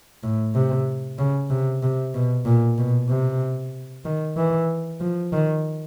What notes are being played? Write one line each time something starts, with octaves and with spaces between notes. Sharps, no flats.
A2
C3
C#3
C3
C3
B2
A#2
B2
C3
D#3
E3
F3
D#3